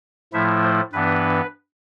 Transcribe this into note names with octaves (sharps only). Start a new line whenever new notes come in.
A2 F3 A3 E4 E5
C5
G2 E3 B3 D4 B4